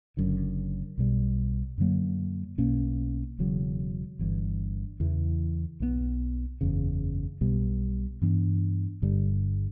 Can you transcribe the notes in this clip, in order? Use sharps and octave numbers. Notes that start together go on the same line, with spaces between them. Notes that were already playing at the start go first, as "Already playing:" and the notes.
F#1 F#2 D3
B1 B2 G3
F#2 D3 F#3 A#3
B1 B2 A#3 C#4
E1 E2 C#3 F#3
G1 G2 E3
E2 C#3 E3
B1 B2 G3 B3
F#1 E2 C#3
B1 B2 G3
G2 E3 B3 D4
G1 G2 D3 G3